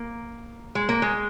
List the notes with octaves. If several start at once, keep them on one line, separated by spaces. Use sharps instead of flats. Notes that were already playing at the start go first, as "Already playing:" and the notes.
Already playing: A#3
G#3
A#3
G#3